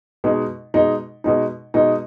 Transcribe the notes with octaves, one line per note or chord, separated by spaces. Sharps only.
B2 G#3 D#4
B2 G#3 D#4
B2 G#3 D#4
B2 G#3 D#4